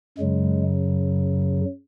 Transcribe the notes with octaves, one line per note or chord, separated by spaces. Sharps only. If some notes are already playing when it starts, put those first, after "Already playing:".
F#2 C#3 F#3 G#3